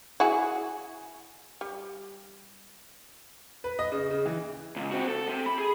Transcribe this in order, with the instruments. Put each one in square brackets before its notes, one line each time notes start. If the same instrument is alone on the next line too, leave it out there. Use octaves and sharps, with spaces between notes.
[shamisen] E4 F#4 G#4
G3
[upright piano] B4
D#5
C#3
C#3
E3
[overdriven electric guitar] C#2
C4 F#4
A4
C3
B5
G#4